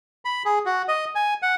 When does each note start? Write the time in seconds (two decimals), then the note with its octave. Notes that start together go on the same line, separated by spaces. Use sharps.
0.25 B5
0.45 G#4
0.66 F#4
0.88 D#5
1.15 G#5
1.42 F#5